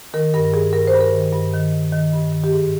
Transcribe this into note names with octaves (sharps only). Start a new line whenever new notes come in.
D#3 A#4
G2 A#4
G2 G#4
G2 A#4
C5
G2
A#4
D#3
G2
D#3
D#3
D#3
G2
D#3
G4
G#2 G#4